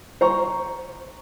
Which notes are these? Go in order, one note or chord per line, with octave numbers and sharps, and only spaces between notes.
C5 A#5 C#6